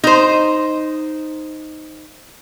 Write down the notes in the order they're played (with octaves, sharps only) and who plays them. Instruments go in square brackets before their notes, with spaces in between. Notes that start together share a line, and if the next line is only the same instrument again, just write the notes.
[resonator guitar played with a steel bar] D#4 C5